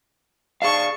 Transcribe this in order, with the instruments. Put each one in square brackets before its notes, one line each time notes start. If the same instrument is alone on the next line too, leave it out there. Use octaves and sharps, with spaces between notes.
[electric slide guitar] G#4 D5 F5 [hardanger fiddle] A5 C#6